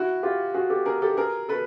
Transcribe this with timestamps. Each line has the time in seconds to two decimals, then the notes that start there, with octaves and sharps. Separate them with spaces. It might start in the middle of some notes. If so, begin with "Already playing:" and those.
Already playing: E4 F#4
0.23 F4 G4
0.54 F#4 G#4
0.70 G4 A4
0.86 G#4 A#4
1.02 G4 A4
1.17 G#4 A#4
1.49 A4 B4